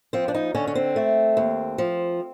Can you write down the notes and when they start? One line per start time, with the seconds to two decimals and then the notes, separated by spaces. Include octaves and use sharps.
0.13 F3 C4
0.28 D4
0.34 D#4
0.55 D3 C#4
0.67 C#4
0.75 C4
0.96 A3
1.37 D#2
1.78 F3